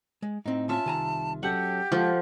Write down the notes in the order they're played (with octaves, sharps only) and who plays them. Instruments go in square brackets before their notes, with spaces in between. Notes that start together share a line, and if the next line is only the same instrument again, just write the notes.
[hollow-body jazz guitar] G#3
[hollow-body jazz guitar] A2 C4 [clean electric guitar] D#4
[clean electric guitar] C#4 [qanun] F4 E5 [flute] A5
[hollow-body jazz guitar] C2 G#5 A#5 [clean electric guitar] D#3
[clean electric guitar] F#3 C#4 A4 [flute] G4 [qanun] F#5
[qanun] F3 [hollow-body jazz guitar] G#3 [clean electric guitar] E4 A4 F#5